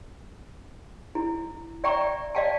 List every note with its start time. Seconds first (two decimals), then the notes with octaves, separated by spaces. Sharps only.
1.15 E4
1.84 D5 E5 G5 A#5 C#6
2.35 D5 D#5 F5 G5 A5